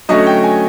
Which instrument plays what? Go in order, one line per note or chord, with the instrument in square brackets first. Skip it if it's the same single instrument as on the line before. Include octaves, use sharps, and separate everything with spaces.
[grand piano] D3 F#3 A3 C#4 D#5
G5
G#5